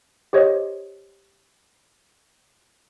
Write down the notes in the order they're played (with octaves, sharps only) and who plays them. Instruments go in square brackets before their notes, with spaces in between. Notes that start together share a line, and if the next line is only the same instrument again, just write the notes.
[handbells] G4 C5 C#5 D#5